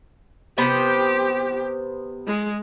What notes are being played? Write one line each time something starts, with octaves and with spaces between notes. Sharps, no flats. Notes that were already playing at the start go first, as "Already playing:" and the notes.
C3 B3 G4 C5
G#3